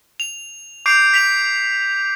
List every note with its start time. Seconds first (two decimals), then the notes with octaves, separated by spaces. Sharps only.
0.20 F7
0.86 D6 G6 C7 D7
1.14 B6 F7